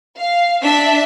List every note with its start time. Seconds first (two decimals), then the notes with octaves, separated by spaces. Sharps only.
0.18 F5
0.62 D4 E5 B6